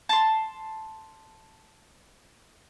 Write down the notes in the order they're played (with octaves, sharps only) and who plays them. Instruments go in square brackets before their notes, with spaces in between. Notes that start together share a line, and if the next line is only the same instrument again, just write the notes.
[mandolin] A5 C6